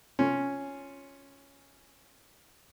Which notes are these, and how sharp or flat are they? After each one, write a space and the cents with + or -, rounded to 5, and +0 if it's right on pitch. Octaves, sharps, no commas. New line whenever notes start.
C#4 +0 F4 +5